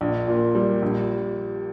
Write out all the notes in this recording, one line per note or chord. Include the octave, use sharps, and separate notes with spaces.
A#1
A#2
G3
A#1